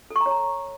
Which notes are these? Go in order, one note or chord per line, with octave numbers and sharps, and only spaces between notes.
A4
C#6
A#5
C#5
A#5